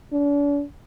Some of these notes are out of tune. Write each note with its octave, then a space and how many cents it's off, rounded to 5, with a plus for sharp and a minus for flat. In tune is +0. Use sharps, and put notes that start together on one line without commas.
D4 -40